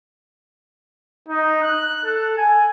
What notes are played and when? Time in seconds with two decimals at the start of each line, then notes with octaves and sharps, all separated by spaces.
1.28 D#4
1.63 F#6
2.04 A4
2.37 G#5